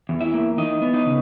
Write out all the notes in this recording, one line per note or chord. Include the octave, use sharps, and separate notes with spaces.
E2
E4 E5
A#3
E3 D#4 D#5
B3
D#4 D#5
C#3